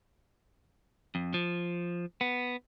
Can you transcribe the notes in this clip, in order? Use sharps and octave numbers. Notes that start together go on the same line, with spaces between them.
F2
F3
B3